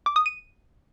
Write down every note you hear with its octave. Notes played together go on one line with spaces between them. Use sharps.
D6
D#6
D#7